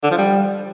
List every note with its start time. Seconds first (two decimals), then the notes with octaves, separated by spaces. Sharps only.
0.03 D3
0.11 F3
0.18 G3